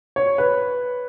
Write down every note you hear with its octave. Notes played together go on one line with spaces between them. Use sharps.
C#5
B4